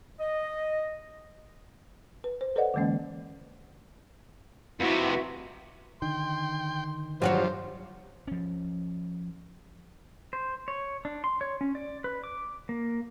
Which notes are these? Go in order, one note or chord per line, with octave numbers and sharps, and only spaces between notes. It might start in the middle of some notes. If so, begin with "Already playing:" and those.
D#5
B4
C5
A4 B4 C5 D5 D#5 F#5
D3 E3 G#3 A#3 C#4
F2 C3 E4 F#4 B4
D3 D#3 G5 C6
G2 F3 F#3 F#4 C5 C#5
F3 C#4
C5
C#5
D4
C6
C#5
C#4
D5
B4
D6
A#3